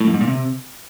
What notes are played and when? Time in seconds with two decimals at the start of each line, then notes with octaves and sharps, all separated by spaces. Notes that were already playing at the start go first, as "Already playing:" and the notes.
0.01 A2
0.07 F#2
0.14 G#2
0.21 A#2
0.27 C3